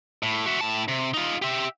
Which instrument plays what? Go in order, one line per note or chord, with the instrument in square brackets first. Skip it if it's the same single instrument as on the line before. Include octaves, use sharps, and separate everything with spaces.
[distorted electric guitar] A2
F#4 E5
A2 A5
C3
D#4 F4
G4 E5